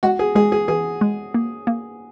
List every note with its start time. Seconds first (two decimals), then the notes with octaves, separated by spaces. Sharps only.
0.03 G#3 F#4
0.19 G#4
0.35 G#3 G#4
0.52 G#4
0.68 E3 G#4
1.01 G#3
1.34 A#3
1.67 A#3